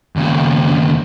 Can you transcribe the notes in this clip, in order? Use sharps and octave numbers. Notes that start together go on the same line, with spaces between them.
D#2 C#3